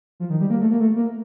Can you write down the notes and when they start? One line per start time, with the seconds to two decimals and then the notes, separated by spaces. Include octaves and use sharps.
0.20 F3
0.30 D#3
0.41 G3
0.50 A#3
0.61 A3
0.71 A#3
0.80 A3
0.96 A#3